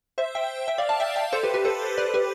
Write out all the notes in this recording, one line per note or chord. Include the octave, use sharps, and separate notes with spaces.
C5 E5
E5 G5
E5 G5
D5 F5
F5 A5
E5 G5
E5 G5
A4 C5
G4 B4
G4 B4
A4 C5
B4 D5
G4 B4